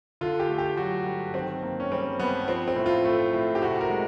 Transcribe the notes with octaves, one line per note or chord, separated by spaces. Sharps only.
D3 F4
G4
A3
G4
F#3 F#4
G2
D#3 C4
A#3
C#4
G3 C4
G2 B3
F3 C4
C4
A2
F4
A3
A2
G4
C3 F#4
A#4
G#3